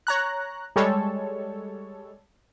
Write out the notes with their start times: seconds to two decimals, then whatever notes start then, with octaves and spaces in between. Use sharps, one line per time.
0.07 C#5 A#5 F#6
0.76 G3 G#3 A4 C#5